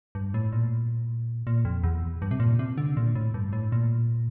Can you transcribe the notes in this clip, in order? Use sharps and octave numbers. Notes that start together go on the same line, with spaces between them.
G2
A2
A#2
A#2
F2
E2
G2
C3
A#2
C3
D3
A#2
A2
G2
A2
A#2